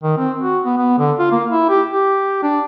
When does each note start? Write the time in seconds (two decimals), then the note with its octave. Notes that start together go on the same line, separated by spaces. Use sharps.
0.03 D#3
0.18 C4
0.41 F#4
0.65 B3
0.77 B3
0.98 D3
1.19 F4
1.32 A#3
1.51 E4
1.69 G4
1.89 G4
2.43 D4